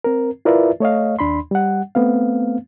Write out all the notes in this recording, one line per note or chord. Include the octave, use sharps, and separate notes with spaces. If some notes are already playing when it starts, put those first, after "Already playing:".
C4 A#4
E4 F4 A#4 B4 D5 E5
A3 C#5 D#5 F5
D#2 D4 B5 C6
G3 F#5
A3 B3 C4 F5